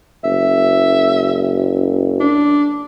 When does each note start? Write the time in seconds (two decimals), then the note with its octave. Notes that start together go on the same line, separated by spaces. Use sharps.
0.24 F#1 E5
2.20 D4